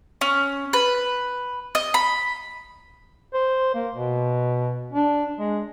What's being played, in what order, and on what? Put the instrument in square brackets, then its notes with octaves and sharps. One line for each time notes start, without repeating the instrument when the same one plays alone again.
[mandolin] C#4
B4
D#5
B5
[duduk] C5
A#3
B2
D4
G#3